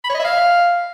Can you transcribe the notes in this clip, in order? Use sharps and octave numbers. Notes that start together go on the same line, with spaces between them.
B5
C#5
D#5
E5
F5